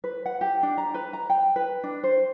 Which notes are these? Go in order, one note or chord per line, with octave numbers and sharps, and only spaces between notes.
B4
F#5
G4
D4
A#5
B4
A#5
G5
B4
D4
C5